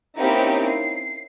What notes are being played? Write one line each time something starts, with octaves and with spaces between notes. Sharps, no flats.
A#3 C4 C#4 D#4 E4 G4
C7